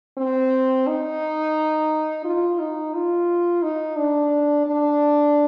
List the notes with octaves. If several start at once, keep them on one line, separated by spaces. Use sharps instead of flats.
C4
D#4
F4
D#4
F4
D#4
D4
D4